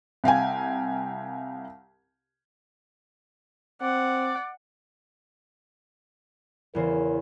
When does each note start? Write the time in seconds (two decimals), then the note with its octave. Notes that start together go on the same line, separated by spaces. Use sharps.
0.24 C2 F5 G5 G#5
3.81 C4 D5 F#5
6.75 E2 C#3 A#4 C5